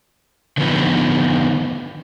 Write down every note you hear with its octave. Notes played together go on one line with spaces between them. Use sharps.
D3 D#3 F3 B3